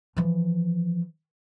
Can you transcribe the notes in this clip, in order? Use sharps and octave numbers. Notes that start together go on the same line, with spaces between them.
E3 F3